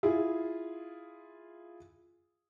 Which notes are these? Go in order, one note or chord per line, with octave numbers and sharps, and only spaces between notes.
E4 F4 G#4